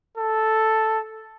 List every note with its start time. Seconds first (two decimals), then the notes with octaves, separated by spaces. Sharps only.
0.17 A4